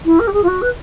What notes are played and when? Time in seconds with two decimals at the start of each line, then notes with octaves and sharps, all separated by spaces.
0.05 E4
0.19 A#4
0.27 G4
0.33 G#4
0.43 F4
0.48 F#4
0.62 B4